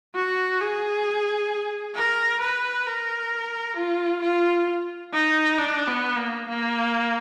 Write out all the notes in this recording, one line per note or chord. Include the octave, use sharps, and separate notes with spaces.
F#4
G#4
A#4
B4
A#4
F4
F4
D#4
D4
B3
A#3
A#3